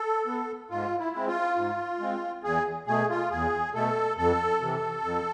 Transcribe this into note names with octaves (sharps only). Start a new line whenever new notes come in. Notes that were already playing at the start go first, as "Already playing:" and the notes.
Already playing: A4
B3
G#2 F4
E4
G#3 C4
F4
G#2
G#3 C4
E2 G#4
B2 A3 G#4
F4
E2 G#4
B2 A3 A4
F2 A4
C3 E3
F2